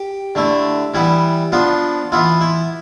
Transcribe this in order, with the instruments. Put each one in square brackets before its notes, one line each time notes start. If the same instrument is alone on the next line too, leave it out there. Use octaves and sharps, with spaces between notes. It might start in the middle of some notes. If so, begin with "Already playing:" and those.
Already playing: [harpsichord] G4
D3 A3 E4
E3 G3 B3 E4
F3 B3 D4 F4
E3 B3 E4 F4
E4